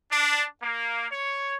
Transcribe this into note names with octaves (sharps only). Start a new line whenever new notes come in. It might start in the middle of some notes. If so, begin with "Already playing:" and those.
D4
A#3
C#5